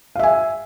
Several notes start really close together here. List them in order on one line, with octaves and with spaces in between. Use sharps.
F5 E5 G#5